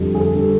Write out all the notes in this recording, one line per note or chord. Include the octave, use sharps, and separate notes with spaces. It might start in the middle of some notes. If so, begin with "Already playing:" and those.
Already playing: F2 D3 G3
G#4
A4
D3 G3 A4